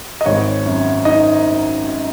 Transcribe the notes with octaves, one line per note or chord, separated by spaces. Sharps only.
D#5
G#1 C#5
F#2
D#4 D#5